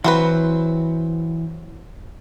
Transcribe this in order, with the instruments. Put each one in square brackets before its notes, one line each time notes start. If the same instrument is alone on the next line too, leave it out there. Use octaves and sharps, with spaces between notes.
[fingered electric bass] E3 [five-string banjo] F#3 C4 B4